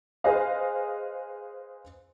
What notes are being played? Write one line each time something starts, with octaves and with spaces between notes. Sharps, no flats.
G#4 B4 C5 D#5 F5